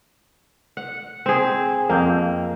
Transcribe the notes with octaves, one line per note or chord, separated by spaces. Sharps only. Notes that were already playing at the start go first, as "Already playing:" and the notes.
F#5
C4 G#4
F2 A#3 G5